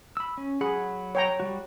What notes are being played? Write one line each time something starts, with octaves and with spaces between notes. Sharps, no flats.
B5 E6
C#4
F#3 G#4 F#5 B5
C#5 G5 A#5
G3 F#4